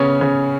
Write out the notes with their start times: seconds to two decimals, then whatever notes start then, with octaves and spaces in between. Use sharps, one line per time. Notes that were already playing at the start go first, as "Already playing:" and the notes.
Already playing: C#3 B3 C#4 C#5
0.21 C#3